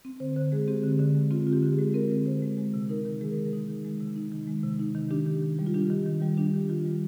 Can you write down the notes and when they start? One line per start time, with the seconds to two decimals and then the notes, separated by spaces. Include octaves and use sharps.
0.05 C4
0.20 D3 C5
0.36 D3 C5
0.52 G#3 G#4
0.68 C4 G4
0.83 D3
0.99 D3
1.15 G#3
1.31 C4 F4
1.47 D3 F4
1.53 G4
1.63 D3
1.73 G#4
1.79 G#3
1.94 C4 A#4
2.10 D3
2.26 D3 C5
2.42 G#3
2.58 G#3
2.74 C3
2.89 D#4 A#4
3.05 D#3
3.21 G#3 G#4
3.30 A#4
3.37 C3 G#4
3.53 D#4
3.68 D#3
3.85 G#3
4.00 C3
4.16 D#4
4.32 D#3
4.47 G#3
4.63 C3
4.79 D#4
4.95 D#3
5.11 D4 G4
5.27 D#3
5.43 D#3
5.59 G3
5.67 F4
5.74 D4 G4
5.90 D#3
6.06 D#3
6.22 G3
6.37 D4 G4
6.54 D#3
6.69 D#3 F4
6.85 G3